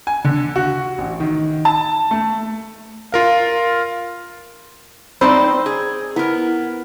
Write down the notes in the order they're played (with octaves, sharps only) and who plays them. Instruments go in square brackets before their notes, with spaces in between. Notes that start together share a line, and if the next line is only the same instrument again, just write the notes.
[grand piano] G#5
D3
F#4
A1
D#3
A5
A3
[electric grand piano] F4 A#4 F5
[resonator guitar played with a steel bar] C4 D#4 D5 [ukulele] C5 [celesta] B5 E6
[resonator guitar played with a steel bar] G#4
[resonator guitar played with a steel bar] B3 A#4 [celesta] E4